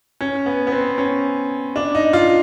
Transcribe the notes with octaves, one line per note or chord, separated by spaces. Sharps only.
C#4
B3
B3
C4
C#4
D4
D#4
F4